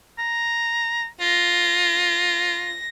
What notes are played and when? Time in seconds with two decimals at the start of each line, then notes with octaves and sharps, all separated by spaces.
0.19 A#5
1.21 F4 A#6